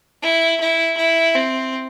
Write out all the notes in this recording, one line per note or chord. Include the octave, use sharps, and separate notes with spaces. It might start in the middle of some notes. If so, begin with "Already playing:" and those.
E4
E4
E4
C4